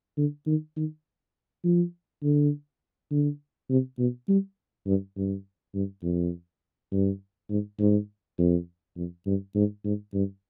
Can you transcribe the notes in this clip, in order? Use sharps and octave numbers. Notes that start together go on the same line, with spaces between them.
D3
D#3
D#3
F3
D3
D3
C3
B2
G3
G2
G2
G2
F2
G2
G#2
G#2
F2
F2
G2
G#2
G#2
G2